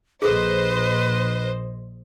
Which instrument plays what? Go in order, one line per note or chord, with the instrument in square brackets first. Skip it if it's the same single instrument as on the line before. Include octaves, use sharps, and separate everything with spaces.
[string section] A#1 C5 D#5 [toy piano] G#4 A4 [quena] B4